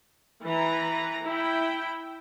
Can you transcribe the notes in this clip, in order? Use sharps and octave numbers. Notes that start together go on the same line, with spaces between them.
E3 B4 A#5
E4 G5